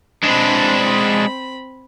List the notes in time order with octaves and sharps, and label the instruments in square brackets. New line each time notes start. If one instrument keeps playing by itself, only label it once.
[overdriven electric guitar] G#3 D4 [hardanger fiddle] C4 B5